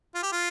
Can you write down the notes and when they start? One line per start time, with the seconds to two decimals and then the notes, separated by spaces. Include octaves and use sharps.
0.15 F4
0.23 G4
0.32 F4